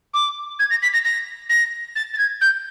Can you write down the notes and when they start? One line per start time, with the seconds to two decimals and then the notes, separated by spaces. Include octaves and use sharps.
0.14 D6
0.59 G#6
0.70 A#6
0.82 B6
0.93 A#6
1.05 A#6
1.50 A#6
1.96 A6
2.14 A6
2.18 G#6
2.41 G6